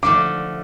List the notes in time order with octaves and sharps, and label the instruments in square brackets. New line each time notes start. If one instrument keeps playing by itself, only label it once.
[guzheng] D3 F3 A3 [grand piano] D6